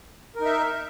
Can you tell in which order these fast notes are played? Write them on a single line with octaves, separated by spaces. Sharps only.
A#4 D#4 E5